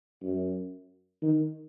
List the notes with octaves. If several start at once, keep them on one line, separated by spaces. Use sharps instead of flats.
F#2
D#3